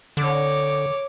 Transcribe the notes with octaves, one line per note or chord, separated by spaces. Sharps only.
D3 C#5 D6